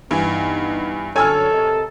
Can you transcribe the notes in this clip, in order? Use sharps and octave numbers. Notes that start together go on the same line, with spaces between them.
G2 E3 B3 D#4
F#2 D3 A4 C#5 G#5 E6 F6
C3 A#4 D#5